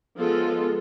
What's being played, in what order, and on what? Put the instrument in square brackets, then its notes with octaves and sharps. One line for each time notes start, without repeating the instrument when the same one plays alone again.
[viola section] F3 G#3 B3 F4 A4